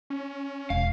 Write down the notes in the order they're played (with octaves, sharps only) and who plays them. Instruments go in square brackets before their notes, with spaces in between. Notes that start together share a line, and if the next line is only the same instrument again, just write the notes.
[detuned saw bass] C#4
[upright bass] E1 [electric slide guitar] F5